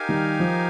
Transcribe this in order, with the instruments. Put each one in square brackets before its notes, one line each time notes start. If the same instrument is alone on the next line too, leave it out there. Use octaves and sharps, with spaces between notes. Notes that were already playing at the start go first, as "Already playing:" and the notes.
Already playing: [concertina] D#4 G4 A#4 F5 G#5
[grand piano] D#3 G3
F3